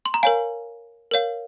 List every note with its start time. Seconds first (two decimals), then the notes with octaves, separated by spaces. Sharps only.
0.06 C6
0.14 A#5
0.23 A#4 C#5 F5 G#5
1.11 A#4 C#5 F5